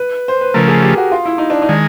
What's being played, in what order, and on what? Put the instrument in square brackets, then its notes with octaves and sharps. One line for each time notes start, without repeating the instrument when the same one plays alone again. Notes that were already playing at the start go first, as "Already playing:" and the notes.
Already playing: [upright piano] B4
C5
B4
[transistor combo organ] C#3 F3 A3 [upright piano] A#4
[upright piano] G#4
G4
F#4
F4
E4
D#4
D4
D#4
[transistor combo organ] D#3 G#3